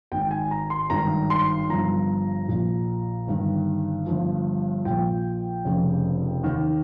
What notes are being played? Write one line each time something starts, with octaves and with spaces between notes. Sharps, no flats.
G#1 G#2 D#3 G5
G5
G#5
A#5
C6
G#1 G2 D#3 A#5
C6
G1 G2 F3 A#5
A#1 A#2 F3
G1 G2 D#3
G1 G2 F3
A#1 A#2 F3 G5
F1 F2 C#3
D#2 D#3